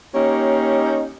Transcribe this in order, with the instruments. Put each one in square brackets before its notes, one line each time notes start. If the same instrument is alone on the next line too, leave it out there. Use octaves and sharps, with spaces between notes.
[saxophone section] A#3 C#4 D#4 G4 C#5